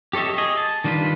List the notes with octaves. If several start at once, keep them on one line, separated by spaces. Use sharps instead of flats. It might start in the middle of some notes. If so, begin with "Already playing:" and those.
G4 A4 C#5 D#5 E5
G#4 D#5
A5
D#3 G3 D4 F4 B4